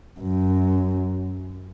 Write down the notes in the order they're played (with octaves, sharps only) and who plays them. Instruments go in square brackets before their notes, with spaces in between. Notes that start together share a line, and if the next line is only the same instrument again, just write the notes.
[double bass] F#2